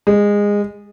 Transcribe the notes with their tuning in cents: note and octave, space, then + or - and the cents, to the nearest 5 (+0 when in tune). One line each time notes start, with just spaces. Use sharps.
G#3 -20